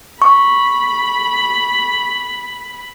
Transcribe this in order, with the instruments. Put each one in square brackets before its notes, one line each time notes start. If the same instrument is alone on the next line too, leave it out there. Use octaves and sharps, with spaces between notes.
[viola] B5 [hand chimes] C#6